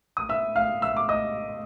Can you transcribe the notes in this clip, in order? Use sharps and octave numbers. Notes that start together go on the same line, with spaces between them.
D#6
E5 E6
F5 F6
E5 E6
D6
D#5 D#6